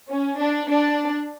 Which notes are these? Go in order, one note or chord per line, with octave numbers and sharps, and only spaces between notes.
C#4
D4
D4